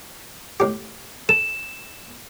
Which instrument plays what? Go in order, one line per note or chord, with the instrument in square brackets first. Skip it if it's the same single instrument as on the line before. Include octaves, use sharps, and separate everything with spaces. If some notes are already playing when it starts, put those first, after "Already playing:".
[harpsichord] A2 G4
[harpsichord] A4 [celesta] E7